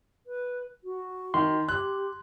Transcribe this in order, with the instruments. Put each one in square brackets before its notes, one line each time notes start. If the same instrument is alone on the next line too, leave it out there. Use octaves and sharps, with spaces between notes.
[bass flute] B4
F#4
[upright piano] D#3 [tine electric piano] C6
[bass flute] G4 [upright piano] F#6